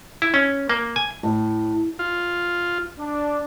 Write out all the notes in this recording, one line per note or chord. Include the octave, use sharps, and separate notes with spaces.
E4
C#4
A#3
G#5
A2
F4
D4